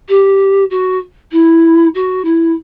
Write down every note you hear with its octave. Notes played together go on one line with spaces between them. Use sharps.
G4
F#4
E4
F#4
E4